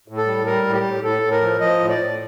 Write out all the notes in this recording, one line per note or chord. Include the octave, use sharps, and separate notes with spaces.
A2
A4
G3
G3 A#4
A2
G4
A2
A2 A4
A2
A#4
F3
F3 D#5
A2
D5
A2